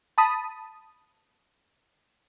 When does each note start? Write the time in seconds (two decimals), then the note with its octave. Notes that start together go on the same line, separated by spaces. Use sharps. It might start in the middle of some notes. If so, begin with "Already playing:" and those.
0.18 A5 B5 D#6